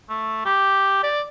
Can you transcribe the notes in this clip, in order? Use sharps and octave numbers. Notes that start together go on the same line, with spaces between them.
A3
G4
D5